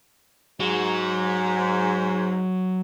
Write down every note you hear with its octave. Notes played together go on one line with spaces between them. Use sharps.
G#2 F#3